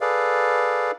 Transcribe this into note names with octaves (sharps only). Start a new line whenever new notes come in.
G#4 A4 B4 D5 F5